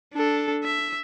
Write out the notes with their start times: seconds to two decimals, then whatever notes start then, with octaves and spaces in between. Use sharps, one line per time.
0.14 D4 A4
0.64 E5